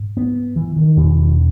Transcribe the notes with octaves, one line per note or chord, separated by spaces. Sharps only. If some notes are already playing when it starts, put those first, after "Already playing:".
Already playing: G#2
B3
E3
D#3
E2 B2